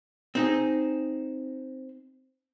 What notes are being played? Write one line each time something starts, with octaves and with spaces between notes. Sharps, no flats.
C4 D#4 G#4